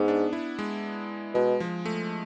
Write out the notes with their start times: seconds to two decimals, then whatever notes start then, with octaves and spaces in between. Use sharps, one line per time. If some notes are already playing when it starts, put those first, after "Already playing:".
Already playing: G#2 B3
0.08 D4
0.33 E4
0.59 G#3
1.34 B2 G#3
1.60 F3
1.85 A3